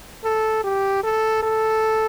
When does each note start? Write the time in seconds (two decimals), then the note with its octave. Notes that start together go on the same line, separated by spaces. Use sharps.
0.24 A4
0.64 G4
1.04 A4
1.43 A4